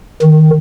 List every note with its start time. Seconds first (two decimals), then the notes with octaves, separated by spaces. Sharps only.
0.22 D#3